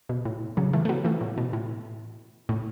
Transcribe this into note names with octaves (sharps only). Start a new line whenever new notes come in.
B2
A2
C#3 F#3
E3 A3
A3
F#3 B3
E3 A3
A2
B2
A2
A2